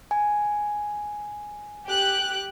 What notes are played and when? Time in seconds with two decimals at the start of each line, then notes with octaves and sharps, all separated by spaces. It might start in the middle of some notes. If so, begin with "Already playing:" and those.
0.11 G#5
1.85 G4 F#6